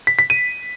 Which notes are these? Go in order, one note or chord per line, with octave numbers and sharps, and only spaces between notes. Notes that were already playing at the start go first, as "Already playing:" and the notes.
B6
B6
D#7